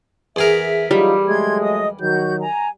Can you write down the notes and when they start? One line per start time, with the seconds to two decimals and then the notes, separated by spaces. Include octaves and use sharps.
0.36 E2 G#4 A#4 E5
0.91 F#3 G3 D#4 F4
1.27 F#3 G#3 A3 C6 G#6
1.61 D#5 D#6
2.00 D#3 F#3 F#4 G6
2.40 G#5 A#5